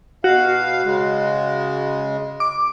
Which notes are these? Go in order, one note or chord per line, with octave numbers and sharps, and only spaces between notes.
B2 F#4 F5
C#3 G#3
D6